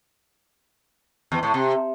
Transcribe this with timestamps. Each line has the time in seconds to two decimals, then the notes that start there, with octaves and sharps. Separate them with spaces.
1.32 E2
1.43 A2
1.54 C3